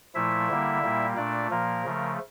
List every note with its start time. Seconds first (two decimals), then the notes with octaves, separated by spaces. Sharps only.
0.15 A#2 F3 A3 E4 E5
0.49 D3 G3 A#3
0.83 A#2 G3 A#3
1.17 A#2 A3 D4 D5
1.51 A#2 F3 A#3 A#4
1.84 C#3 F3 A3